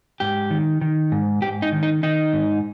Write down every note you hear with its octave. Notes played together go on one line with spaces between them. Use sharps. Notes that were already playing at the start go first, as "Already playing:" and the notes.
G#2 G4
D#3
D#3
G#2
G#2 G4
D#4
D#3
D#4
D#3 D#4
G#2